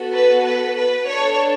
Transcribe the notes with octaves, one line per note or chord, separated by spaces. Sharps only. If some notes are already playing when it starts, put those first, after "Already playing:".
Already playing: B3 F#4 A4
B4
B4
B4
D4 A4 C#5